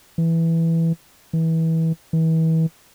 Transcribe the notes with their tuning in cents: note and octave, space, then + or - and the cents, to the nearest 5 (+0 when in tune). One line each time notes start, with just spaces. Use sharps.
E3 +0
E3 -25
E3 -35